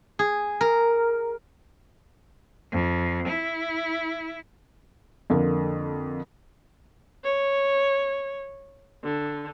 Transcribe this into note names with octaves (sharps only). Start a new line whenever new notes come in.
G#4
A#4
F2
E4
F2 D3 A#3
C#5
D3